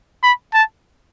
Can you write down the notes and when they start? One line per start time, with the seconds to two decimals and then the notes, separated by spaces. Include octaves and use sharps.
0.23 B5
0.54 A5